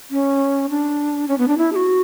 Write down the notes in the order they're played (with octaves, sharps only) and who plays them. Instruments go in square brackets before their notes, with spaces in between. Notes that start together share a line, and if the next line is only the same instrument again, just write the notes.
[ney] C#4
D4
C#4
B3
D4
E4
G#4
F#4